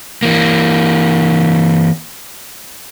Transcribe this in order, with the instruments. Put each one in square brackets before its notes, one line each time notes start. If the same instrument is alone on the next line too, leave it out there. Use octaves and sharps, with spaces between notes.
[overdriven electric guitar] E3 A#3